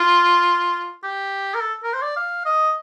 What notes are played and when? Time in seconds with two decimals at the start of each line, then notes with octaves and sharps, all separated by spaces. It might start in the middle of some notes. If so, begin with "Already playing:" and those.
Already playing: F4
1.04 G4
1.54 A#4
1.60 A4
1.84 A#4
1.93 C5
2.02 D5
2.16 F5
2.46 D#5